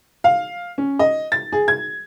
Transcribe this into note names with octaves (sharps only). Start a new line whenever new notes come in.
F5
C#4
D#5
A6
G#4
G#6